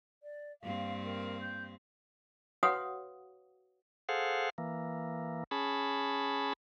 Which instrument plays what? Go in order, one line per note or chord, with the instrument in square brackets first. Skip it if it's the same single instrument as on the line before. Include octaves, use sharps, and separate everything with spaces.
[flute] D5
[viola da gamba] G2 A#3 C4 [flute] F5
[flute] A#4
G6
[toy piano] F#4 B4 C#5 F5 F#5 D#6
[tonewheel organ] G#4 A4 C5 F5 F#5
E3 A#3
C#4 G#4 A5 B5